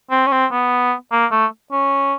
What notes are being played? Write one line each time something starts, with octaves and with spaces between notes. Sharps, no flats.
C4
C#4
C4
B3
A#3
A3
C#4